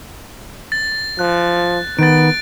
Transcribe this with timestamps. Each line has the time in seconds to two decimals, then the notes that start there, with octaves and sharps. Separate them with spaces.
0.72 A6
1.19 F3 F#6
1.99 D#3 B3 A6 D7